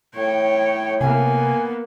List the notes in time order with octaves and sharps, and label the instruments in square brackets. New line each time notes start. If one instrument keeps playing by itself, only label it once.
[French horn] A2 [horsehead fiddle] C#5 G5
[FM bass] C3 [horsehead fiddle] A#3 B3 [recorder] G#5